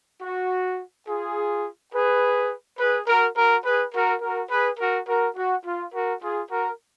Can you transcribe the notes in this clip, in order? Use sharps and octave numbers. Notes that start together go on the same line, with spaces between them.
F#4
F4 G#4
G#4 B4
G#4 B4
F#4 A#4
F#4 A#4
G#4 B4
F#4 A#4
F#4 A#4
G#4 B4
F#4 A#4
F#4 A#4
F#4
F4
F#4 A#4
F4 G#4
F#4 A#4